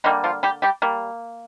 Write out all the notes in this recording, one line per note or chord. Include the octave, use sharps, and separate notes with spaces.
D3 D#3 G3 A#3 D#4
F3 F4
G3 G4
G3 G4
G3 A#3